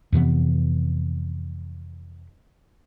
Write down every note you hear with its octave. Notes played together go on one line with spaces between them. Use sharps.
F2 C3 E3 B3